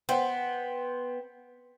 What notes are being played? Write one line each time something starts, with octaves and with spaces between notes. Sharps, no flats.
B3 C5 G5